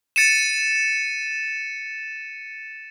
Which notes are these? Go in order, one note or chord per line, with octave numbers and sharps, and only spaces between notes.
A6 C#7 D#7 E7